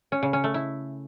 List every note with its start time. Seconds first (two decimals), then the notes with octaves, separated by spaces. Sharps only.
0.12 C#4
0.23 C#3
0.33 C#4
0.44 A3
0.54 E4